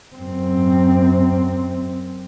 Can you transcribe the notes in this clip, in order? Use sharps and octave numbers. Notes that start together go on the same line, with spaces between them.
F#2 C4